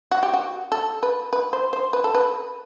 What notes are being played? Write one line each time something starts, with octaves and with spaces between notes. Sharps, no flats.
F#4
G4
F#4
A4
B4
B4
C5
C5
B4
A4
B4